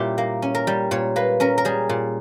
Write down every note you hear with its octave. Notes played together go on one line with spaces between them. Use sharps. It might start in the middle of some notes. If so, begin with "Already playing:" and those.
Already playing: A#2 G3 C#4 E4 G4
A#3
C#4
A#4
G3
A#2 C#5
A#3 B4
C#4 A#4
A#4
G3 G#4
A#2